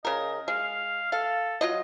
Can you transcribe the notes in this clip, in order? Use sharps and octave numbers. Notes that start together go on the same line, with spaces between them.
C#3 A#4 D#5
G#3 F5
A4 F5
F#3 F4 D#5